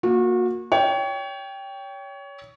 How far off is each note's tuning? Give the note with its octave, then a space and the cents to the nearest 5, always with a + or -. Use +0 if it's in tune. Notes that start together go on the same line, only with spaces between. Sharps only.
A#3 +0 F#4 -30
C#5 +25 G5 +0